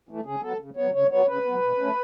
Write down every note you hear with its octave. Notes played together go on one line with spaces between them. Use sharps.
E3 A3
C#3 G#4
F#3 B3 A4
C#3
F#3 B3 C#5
C#3 C#5
F#3 B3 C#5
C#3 B4
F#3 B3
B2
A3 C#4